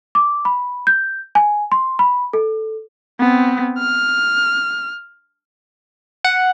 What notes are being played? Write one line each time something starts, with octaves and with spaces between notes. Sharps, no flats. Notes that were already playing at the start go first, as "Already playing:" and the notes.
D6
B5
G6
G#5
C6
B5
A4
B3 C4
F6
F#5